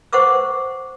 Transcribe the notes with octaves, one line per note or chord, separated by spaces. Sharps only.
C5 F#5 C#6 D6 E6